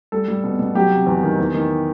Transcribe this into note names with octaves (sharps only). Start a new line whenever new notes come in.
G3 A4
G3
B2
B2
F#3 G4
C3
E2
D#3
E2
D#3